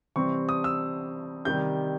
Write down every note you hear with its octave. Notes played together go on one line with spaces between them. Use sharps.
C3 E3 G3 C4 C#6
D#6
E6
C3 D#3 G3 G6